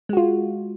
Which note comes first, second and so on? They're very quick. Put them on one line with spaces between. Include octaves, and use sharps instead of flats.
G#3 F#4 F4